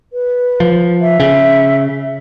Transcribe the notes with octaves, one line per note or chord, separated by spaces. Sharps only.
B4
F3
E5
C#3